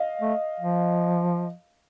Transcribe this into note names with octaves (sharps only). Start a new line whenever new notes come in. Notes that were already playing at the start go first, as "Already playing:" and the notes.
Already playing: D#5 F5
A3
F3